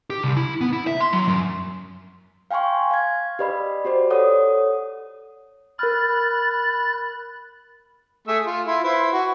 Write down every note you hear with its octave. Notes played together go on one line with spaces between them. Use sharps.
G4
C2
E4
B3
E4
E5
C6
F#3
F#2
F5 G5 G#5 C6 C#6
F5 G#6
G4 B4 D5 D#5 B5
F#4 G4 C5 D5
A4 C#5 F#5 D#6
A#4 B5 F6 F#6 A6
A3 G#4 E5
F4
E4 F4
E4 B4 C5
F#4